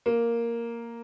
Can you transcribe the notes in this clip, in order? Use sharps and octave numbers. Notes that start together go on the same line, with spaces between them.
A#3